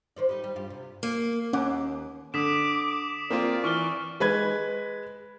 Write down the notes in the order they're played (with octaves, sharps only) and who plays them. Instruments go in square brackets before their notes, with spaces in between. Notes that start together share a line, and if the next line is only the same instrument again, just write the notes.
[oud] D#3 C5 D5
G3 D#4
G3
G2 F4 G4
C3
[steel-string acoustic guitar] A#3
[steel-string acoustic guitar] D#2 [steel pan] C#4 F#5 D6
[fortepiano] D3 [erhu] D6 [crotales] D#6 B6 E7
[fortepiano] A#3 C4 F4 [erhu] D5
[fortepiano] E3 [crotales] C#6 F6 G7
[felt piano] G#3 B4 G#6